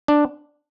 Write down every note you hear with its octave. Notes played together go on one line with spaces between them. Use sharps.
D4